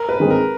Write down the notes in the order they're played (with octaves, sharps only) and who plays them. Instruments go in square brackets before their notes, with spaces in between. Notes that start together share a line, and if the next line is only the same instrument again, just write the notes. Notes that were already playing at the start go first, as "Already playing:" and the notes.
Already playing: [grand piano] A#4
B4
[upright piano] D#3 G#3 C4
[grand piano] A#4